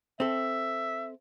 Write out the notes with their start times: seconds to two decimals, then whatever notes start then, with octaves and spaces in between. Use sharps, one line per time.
0.20 C4 A4 E5